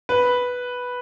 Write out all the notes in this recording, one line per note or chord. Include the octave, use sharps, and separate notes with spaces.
B4